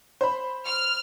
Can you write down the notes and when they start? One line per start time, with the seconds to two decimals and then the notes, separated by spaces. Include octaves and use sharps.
0.21 C5 B5
0.67 F6